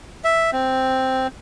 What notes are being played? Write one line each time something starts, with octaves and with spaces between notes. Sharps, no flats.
E5
C4